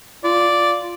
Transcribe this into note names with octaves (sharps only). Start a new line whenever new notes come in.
F4 D5